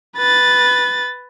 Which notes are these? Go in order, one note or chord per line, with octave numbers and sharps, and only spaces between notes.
B4 A6